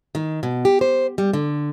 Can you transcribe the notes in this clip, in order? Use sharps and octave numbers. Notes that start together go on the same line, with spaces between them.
D#3
B2
G4
C5
G3
D3